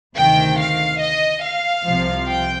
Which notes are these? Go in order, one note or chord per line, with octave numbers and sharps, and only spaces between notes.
D2 C3 D#3 G5
F5
D#5
F5
C2 C3 F3
G5